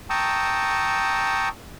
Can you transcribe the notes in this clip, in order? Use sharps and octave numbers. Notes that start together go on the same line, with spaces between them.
G5 A5 A#5 C#6 D#6 E6